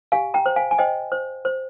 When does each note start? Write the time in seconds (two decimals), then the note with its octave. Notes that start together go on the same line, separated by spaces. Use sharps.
0.12 G4 F5 G#5
0.34 G5 A#5
0.46 C5
0.56 F5 G#5
0.71 G#5
0.78 C5 D#5 G5
1.12 C5
1.45 C5